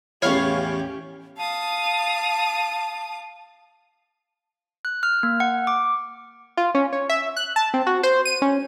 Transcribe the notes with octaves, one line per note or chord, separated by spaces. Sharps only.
A1 E2 C#4 E4 G4 C#5 F5
F5 A5 D#6
F#6
F6
A#3
F#5
D6
F4
C#4
C#5
E5
F#6
A5
C4
F#4
C5
D#7
C#4